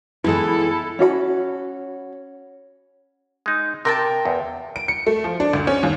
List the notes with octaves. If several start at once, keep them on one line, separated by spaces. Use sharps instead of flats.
E3 G#3 B3 E4 A4
C#4 F#4 D5 B5
G#3 D#4
C3 A#4 G5 A5
E2
D7
C#7
A3
F3
D4
D2
C#4
D#2